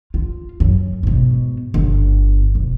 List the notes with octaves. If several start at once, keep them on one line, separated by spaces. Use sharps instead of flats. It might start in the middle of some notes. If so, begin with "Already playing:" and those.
F4
F#2
G#2 B2
G1
E1